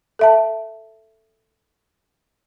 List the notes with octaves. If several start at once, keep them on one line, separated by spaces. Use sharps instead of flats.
A4 E5 A5